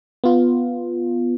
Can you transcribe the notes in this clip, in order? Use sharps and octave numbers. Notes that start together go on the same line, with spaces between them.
B3 F4